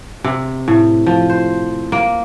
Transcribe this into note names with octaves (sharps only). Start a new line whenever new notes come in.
C3
A2
F3
C5
A#3